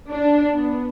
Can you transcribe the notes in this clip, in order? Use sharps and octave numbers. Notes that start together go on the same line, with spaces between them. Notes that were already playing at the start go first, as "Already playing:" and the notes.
D4
B3